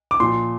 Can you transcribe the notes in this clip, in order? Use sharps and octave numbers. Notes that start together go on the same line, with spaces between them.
D6
A#2 F3 C6